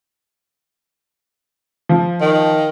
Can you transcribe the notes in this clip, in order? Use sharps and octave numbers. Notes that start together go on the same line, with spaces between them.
F3
D#3